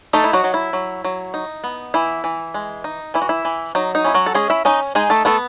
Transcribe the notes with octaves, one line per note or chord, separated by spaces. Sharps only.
A3 D#4 A4
E4
F#3 F#4
F#3
E4
F#3
F#3
D#4
B3
E3 E4
E3
G#3
D#4
E3 E4
F#4
E4
E3
F#3 D#4
D#4
C#4 E4
F#3 F#4
A4
G#3 C#4 G#4
E4 E5
C#4 D#4 D#5
G#3 D#4 G#4
A3 A4
A3 B3 A4